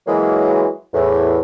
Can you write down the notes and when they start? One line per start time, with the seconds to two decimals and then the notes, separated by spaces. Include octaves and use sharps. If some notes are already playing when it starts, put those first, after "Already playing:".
0.07 E3 F#3 G#3 A#3
0.94 E2 A2